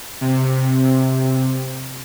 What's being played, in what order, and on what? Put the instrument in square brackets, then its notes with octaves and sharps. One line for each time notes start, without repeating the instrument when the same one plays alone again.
[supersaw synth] C3